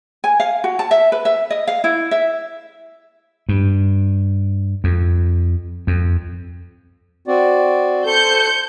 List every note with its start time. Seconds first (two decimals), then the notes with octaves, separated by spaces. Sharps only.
0.24 G#5
0.40 F5
0.64 F#4
0.79 A5
0.91 E5
1.12 B4
1.25 E5
1.50 D#5
1.67 F5
1.84 E4
2.11 E5
3.49 G2
4.84 F2
5.87 F2
7.27 C4 F#4 D5
8.05 A4 C5 G6 C#7